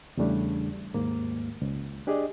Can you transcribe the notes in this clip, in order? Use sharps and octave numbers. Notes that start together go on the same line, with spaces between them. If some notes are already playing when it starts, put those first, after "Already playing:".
E2 C#3 G3 A3 D4
D#2 G#2 A#3
C#2
D4 G4 G#4 D5 D#5